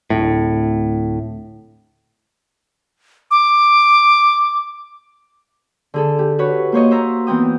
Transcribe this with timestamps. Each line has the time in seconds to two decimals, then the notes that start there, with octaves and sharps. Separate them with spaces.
0.10 D1 A2
3.31 D6
5.94 D3 G#4 A4
6.19 G4
6.39 F#4 B4 C#5
6.72 A#3 C5 C#5 D#5
6.91 C5 E5 A#5
7.27 E3 B3 C4 G5 D#6